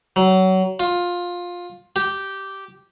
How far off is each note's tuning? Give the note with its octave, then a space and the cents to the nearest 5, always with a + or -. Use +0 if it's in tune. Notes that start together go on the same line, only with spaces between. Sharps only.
F#3 +25
F4 +15
G4 -10